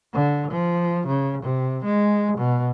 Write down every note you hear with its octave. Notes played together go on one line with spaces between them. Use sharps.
D3
F3
C#3
C3
G#3
B2